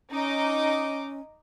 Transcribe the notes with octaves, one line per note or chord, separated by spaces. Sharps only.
C#4 D#4 D#5 D6